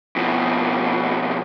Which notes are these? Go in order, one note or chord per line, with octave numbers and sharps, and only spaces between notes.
F2 B2